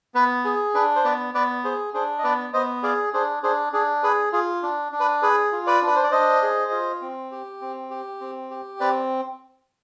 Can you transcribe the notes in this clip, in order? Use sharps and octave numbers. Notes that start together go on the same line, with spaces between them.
B3 B4
G#4
D4 B4
C5
B3 B4 D5
B3 B4 D5
G#4 C5
D4 G#4 C5
D#5
B3 B4 D5
B3 C5 D#5
G#4 D5 F5
D4 G#4 C5
D4 G#4 C5
D4 G#4
G#4 B4
F4 G#4
D4
D4
B4
G#4 B4
F4
B4 D5
D4
B4
C5
D5
D4 C5 D#5
G#4
F4
C4
G4
C4
G4
C4
G4
C4 B4 D5